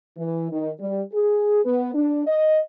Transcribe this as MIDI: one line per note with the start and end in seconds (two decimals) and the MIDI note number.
0.18 0.49 52
0.51 0.70 51
0.80 1.02 55
1.13 1.62 68
1.65 1.92 59
1.94 2.22 62
2.27 2.60 75